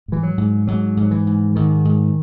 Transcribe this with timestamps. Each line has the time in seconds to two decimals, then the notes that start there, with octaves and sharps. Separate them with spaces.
0.08 G#2 E3
0.23 F#3
0.38 G#2
0.67 G#2 F#3
0.97 G#2
1.03 F#3
1.11 E3
1.27 G#2
1.55 G#2 D#3
1.85 G#2